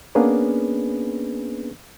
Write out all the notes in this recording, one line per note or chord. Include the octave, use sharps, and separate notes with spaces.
A#3 B3 C#4 D4 G#4 B4